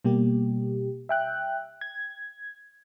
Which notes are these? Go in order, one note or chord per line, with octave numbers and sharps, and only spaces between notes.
B2 G3 A#3 G4
E5 G5 F#6
G#6